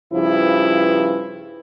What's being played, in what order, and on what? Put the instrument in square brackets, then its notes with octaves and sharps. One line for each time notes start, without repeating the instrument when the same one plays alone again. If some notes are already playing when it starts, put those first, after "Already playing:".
[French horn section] G2 C#3 F3 E4 B4